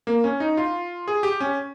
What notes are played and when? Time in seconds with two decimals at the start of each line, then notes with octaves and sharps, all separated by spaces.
0.07 A#3
0.24 C#4
0.40 D#4
0.57 F4
1.08 G#4
1.23 G4
1.40 C#4